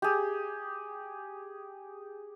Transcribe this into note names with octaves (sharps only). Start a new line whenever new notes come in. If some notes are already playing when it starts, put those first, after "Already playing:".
G4 G#4